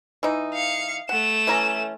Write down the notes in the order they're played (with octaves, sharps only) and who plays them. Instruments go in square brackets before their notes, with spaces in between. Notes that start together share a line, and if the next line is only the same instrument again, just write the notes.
[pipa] E3 D#4
[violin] F5 C#7
[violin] A3 E7 [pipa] F#5
[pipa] E3 C#4 A#5